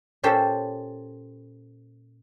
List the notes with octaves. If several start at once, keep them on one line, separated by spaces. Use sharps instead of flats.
A#2 C#4 G4 A4 C5